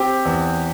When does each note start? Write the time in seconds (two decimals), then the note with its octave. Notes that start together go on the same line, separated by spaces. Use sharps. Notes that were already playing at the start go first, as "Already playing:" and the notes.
Already playing: C4 G4
0.25 E2